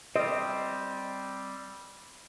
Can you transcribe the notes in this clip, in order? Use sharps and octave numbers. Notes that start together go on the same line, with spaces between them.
G3 C4 D#5